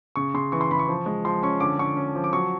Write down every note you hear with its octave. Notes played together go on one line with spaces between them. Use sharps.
C#3 C#6
C#3 C6
E3 C#6
C6
C#3 B5
C#6
F3
G#3
F3 C6
C#4 C#6
D3 D6
D3 C#6
C#4
F3
D6
F#3 C#6